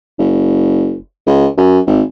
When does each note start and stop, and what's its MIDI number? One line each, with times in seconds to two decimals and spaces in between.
0.18 0.96 30
1.27 1.47 37
1.57 1.79 42
1.87 2.01 32